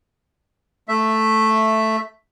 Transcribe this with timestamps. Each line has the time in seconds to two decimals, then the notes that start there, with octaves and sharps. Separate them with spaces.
0.88 A3 E5